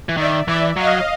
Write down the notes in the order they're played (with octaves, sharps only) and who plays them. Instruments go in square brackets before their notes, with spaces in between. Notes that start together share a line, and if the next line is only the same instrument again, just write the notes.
[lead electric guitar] E3
[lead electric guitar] D#3 [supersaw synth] D5 E5
[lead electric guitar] E3 [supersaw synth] D5 E5
[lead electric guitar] F#3 [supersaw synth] D#5 F5